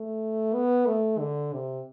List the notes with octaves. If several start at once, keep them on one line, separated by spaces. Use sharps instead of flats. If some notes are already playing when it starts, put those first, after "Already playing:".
Already playing: A3
B3
A3
D3
C3